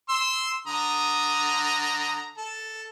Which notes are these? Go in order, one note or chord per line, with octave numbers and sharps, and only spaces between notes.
C6 E6
D3 A#5 D#6
A4